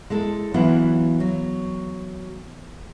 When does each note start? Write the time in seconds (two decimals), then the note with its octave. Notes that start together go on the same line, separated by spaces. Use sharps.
0.10 G#3 E4 A4
0.54 E3 F#3 B3 E4 F4
1.20 F#3